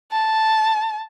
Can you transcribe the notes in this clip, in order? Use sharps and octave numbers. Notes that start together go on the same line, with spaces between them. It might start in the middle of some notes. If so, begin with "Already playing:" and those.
A5